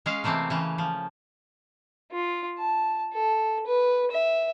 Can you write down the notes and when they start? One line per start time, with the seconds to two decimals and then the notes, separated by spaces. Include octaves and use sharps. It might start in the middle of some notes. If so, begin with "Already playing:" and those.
0.06 G#3 C#4 F5
0.24 C3 E3 A3 A#3 C4
0.50 C#3 E3 C#4
0.78 F3
2.12 F4
2.58 A5
3.13 A4
3.66 B4
4.11 E5